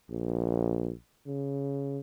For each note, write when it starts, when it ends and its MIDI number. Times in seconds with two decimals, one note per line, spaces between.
0.10 0.92 34
1.27 2.00 49